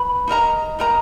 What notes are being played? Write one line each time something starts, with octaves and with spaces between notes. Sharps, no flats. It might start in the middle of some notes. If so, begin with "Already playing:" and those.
Already playing: B4 B5
D#4 A#4 D#5 A#5
D#4 A#4 D#5 A#5